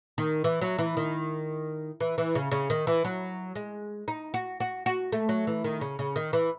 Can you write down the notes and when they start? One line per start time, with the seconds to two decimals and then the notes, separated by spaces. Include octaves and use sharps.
0.18 D#3
0.44 E3
0.61 F#3
0.79 E3
0.97 D#3
2.00 E3
2.18 E3
2.35 C#3
2.51 C#3
2.70 D#3
2.87 E3
3.05 F#3
3.55 G#3
4.08 D#4
4.34 F#4
4.60 F#4
4.86 F#4
5.12 A3
5.29 F#3
5.47 E3
5.64 D#3
5.81 C#3
5.99 C#3
6.16 D#3
6.33 E3